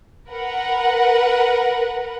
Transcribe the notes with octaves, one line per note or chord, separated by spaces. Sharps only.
A#4 B4 F#5